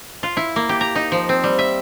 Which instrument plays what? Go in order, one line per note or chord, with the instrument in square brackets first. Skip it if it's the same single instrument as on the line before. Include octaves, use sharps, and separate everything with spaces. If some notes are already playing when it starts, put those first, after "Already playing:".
[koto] F4
E4
A#3
G4
A#5
D#4
F3
C4
G3
E5